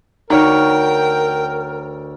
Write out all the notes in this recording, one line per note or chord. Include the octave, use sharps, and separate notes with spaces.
D2 D#4 A#4 C#5 G5 F6